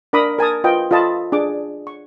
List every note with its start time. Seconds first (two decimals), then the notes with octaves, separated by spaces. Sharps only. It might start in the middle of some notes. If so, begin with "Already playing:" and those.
0.13 D4 A#4 A#5 B5 D6 D#6
0.39 A#4 G#5 A5 D#6
0.64 F4 B4 D#5 G5
0.91 F4 A4 D#5 A5 B5
1.32 D4 G#4 D6
1.87 C#6